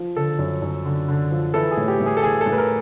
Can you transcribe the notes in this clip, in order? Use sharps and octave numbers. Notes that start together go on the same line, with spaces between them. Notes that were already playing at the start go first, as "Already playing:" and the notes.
Already playing: F3
D3 A4
F#2
F#2
D3
D3
F3
E3 A4
G#4
A2
G4
A2
G#4
A4
E3 G#4
A4
A2
B4
A#4